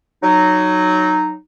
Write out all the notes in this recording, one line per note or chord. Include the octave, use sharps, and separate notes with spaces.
F#3 D#4